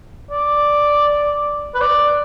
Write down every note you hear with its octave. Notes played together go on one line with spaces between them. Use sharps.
D5
B4
D5